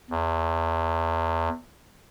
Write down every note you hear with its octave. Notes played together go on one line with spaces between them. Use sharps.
E2